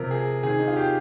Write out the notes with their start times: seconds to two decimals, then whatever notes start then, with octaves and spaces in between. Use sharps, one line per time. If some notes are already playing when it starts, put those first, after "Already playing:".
Already playing: C3 F3 A#4
0.11 G#4
0.43 C3 D#3 G#4
0.59 D#4
0.68 F4
0.77 G4